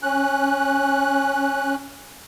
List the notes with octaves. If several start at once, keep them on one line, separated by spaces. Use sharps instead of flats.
C#4 F#6